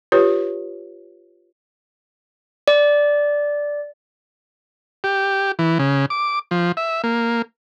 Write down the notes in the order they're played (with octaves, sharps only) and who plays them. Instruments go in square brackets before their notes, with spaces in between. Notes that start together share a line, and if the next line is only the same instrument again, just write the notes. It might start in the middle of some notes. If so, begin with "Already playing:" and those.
[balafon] F4 G4 B4 C#5
[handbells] D5
[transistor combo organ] G4
E3
C#3
D6
F3
E5
A#3